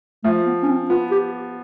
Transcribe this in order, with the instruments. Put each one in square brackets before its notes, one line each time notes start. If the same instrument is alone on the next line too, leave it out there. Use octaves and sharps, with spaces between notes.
[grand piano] F3 [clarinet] A3
[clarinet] B3
C#4
C4
[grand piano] B3 [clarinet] F4
[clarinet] G4